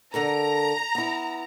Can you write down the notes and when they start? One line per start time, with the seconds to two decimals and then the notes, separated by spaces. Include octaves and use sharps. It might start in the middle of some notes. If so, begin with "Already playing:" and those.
0.14 D3 A4 A#4 A#5
0.95 B3 E4